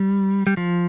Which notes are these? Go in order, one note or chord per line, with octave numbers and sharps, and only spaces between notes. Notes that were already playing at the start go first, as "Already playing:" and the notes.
Already playing: G3
G3
F3